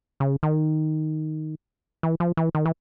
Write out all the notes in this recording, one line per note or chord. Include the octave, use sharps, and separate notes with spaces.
C#3
D#3
E3
F3
E3
D#3
E3